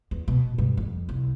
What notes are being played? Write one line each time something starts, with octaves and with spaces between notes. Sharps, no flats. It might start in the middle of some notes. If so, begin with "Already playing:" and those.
E2
B2
G2
F2
C2